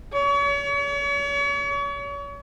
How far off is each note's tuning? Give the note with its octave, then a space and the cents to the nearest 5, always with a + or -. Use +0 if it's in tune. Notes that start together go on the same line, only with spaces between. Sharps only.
C#5 +40